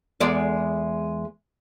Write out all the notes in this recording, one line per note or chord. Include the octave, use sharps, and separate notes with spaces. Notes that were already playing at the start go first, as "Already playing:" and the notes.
E2 G#3 D5